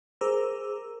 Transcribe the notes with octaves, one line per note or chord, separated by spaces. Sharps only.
G#4 A#4 C5 A#5 D6 E6